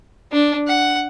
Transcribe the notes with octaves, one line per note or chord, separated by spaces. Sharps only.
D4
F#5